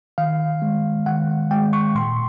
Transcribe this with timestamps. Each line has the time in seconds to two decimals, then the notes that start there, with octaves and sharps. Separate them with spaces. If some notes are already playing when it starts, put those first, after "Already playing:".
0.18 D#3 F5
0.62 G#3
1.06 D#3 F#5
1.51 G#3 G5
1.73 C#6
1.95 A#2 C6